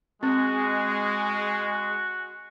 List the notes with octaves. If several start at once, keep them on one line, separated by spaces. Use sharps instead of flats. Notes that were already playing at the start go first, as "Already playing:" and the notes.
G#3 C4 F#4